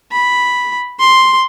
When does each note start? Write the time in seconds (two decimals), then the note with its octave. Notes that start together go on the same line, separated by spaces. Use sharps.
0.12 B5
1.00 C6